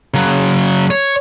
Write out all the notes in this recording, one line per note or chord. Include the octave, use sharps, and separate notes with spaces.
C#3 F#3
C#5